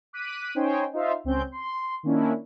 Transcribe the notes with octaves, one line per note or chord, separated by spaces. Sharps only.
D6 F#6 B6 D#7
C#4 D#4 C5 C#5 G5 G#5
D#4 F4 C5 E5 F5
C#2 C4 C#4 G6
C6
D#3 A#3 C#4 D4 E4